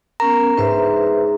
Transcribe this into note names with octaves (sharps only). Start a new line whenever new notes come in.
B3 C#4 A#4 A#5
G#2 B4 C5 E5